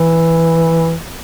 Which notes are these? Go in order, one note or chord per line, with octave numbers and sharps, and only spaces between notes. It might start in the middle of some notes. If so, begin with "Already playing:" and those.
Already playing: E3